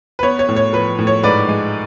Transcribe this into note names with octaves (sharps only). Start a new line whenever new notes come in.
B4
B3 C#5
C#5
A2
C#5
F3 B4
A2
C#5
G#2 B4 D5
G#3